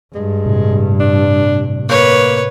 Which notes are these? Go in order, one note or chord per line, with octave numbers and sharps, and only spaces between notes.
G2 G#3
A2 C3
D4
A#3 B4 C#5